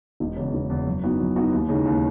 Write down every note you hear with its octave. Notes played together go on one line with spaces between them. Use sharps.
E1
E2 C#3
E1
E2 C#3
F#2
E3 B3 D#4 F#4
F#2
E3 B3 D#4 F#4
D#2
C#3 E3 G#3 D#4
D#2